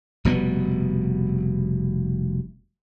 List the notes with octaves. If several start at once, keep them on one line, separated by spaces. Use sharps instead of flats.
F1 B2 G3 B3